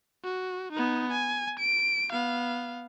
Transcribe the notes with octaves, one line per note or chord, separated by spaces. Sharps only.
F#4
B3 D#4
G#5
D7
B3 F5